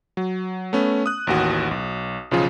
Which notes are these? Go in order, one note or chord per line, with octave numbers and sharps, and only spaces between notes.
F#3
A3 B3 C#4
D#6 F#6
A1 D#2 F#4
B1
B1 C#3 F3 F4 G#4